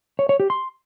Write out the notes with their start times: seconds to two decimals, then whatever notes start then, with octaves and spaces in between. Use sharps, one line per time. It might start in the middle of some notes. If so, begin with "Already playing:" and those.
0.19 C#5
0.29 C#5
0.40 G4
0.50 C6